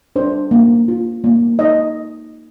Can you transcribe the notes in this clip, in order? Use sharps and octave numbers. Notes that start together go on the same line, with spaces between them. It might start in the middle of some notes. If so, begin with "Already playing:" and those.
D4 C5
A#3
F4
A#3
D#4 D#5